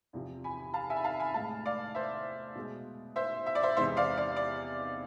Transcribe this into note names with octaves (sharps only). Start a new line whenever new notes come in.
E2 C3 F3
G#5 B5
F5 A5
E5 G#5
B5
F5 A5
G#5 B5
A2 G#3 F5 A5
D5 F5
C5 E5
B2 G#3
C5 E5
E5
D5
C5 E5
E2 C3 E3 G#3 C5 E5
D5 F5
D5
D5